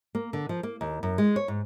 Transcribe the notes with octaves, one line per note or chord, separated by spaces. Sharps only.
A#3
D3
F3
A#3
D#2
F#2
G#3
C#5
G#2